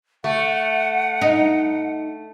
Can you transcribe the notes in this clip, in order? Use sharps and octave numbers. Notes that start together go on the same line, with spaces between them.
A3 F#5
D#4